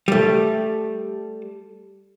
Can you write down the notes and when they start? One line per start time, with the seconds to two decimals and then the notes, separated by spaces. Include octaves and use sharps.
0.08 G3 A3